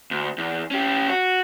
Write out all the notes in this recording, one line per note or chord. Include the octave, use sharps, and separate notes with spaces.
D2
E2
C#4 G4
F#4